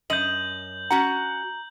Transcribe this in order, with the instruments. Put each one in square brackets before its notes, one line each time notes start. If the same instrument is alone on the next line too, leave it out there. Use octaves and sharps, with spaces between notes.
[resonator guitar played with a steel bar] F#2 D#5 [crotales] G6 F#7
[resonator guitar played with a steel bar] C#4 F#4 F#5 [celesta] A#5